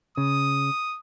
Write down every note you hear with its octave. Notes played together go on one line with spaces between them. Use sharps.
C#3 D#6